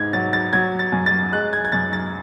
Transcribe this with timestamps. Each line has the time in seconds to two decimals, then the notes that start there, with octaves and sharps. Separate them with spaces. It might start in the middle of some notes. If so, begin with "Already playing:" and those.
Already playing: G#2 G#6
0.13 F#3 A6
0.33 A6
0.53 F#3 G#6
0.79 A6
0.92 F#2
1.06 A6
1.32 G#3 F#6
1.53 G#6
1.65 G#6
1.72 F#2 A6
1.93 A6